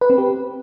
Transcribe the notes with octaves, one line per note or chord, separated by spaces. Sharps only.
B4
C4
G4